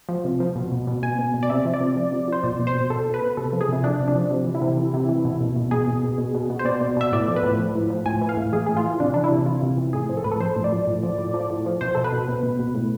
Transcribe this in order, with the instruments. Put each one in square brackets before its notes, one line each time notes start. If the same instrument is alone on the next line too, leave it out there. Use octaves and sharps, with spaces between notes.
[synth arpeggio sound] F3
C3
F3
B2
B2
B2
B2 G#5
B2
B2
D5
C3 E5
F3
D5
C3
F3
C3
F3 C5
B2 D5
B2
C5
B2
B2 A4
B2
B4
B2
C3 A4
F3
G#4
C3 E4
F3 D4
C3
D4
F3
C3
E3
E4
C3
E3
C3
E3
B2
B2
B2
B2 G#4
B2
B2
B2
B2
B2
C5
B2 D5
B2
B2 E5
A2 D5
F3
B4
A2
F3
A2
F3
A2 G#5
E3
F5
A2
E3 G#4
A2 G#4
F4
E3
C3 D4
E3 D4
E4
C3
E3 F4
C3
E3
A2 G#4
F3
A4
A2 B4
A4
F3 C5
A2
D5
F3
A2
F3
A2
F3
A2
F3
B2 C5
B2 A4
B4
B2
B2
B2
B2
A2